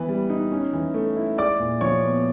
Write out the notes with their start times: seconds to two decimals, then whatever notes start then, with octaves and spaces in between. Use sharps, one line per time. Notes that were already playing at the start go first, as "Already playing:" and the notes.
Already playing: E3 B3 B4
0.09 G3
0.30 D#4
0.52 C#4
0.73 E3
0.94 A3
1.16 E4
1.38 G#3 D5 D6
1.59 A#2
1.81 F3 C#5 C#6
2.04 B3